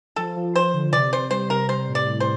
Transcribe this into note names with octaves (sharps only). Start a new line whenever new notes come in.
F3 A4
F3
F3 C5
D3
C3 D5
C3 C5
G3 C5
C3 A#4
G3 C5
A2
D5
A2
C5